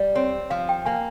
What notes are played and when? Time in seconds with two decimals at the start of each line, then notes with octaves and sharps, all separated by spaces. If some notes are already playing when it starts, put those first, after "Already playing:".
Already playing: G3
0.15 C4 C#5
0.50 F3 F5
0.69 G5
0.86 A#3 G#5